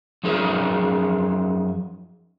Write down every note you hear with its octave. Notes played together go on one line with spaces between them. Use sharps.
F#2 F3 D#4 G#4 A#4 C5